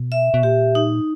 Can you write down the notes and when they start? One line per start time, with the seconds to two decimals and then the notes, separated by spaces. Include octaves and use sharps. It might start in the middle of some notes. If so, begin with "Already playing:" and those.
Already playing: B2
0.12 E5
0.34 B2
0.43 A#2 G4
0.75 D#4